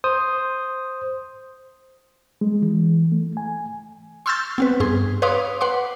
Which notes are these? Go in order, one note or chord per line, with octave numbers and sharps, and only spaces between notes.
C5 D#6
G#3
E3
A3
G#5
C6 C#6 E6 F6 G6 A6
B3 C4 B4
G2 G#4 C6
B4 C#5 F5 C6 D6 D#6
B4 F#5 C6 D6